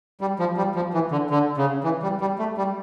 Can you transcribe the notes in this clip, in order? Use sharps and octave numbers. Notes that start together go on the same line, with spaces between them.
G3
F3
G3
F3
E3
D3
D3
C#3
E3
G3
G3
A3
G3